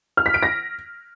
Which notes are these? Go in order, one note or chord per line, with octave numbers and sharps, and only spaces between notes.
F6
B6
D7
A#6